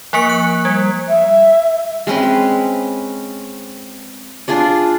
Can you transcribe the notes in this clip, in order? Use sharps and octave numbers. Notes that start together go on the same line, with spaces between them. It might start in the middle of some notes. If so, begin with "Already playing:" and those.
F3 A#3 A#4 C#7
F#6
G3
E5
G#3 C4 C#4 B4
D4 F4 G#4 D5